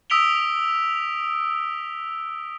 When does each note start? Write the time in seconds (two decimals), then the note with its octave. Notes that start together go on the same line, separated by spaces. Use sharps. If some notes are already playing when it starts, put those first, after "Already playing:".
0.10 D#6 E6 B6 D7 F7 G7